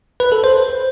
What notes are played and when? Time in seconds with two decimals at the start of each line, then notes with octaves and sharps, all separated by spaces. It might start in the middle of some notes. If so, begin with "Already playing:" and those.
0.20 B4
0.32 A4
0.44 C5